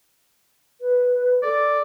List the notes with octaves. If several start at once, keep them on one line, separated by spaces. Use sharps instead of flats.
B4
A4 D5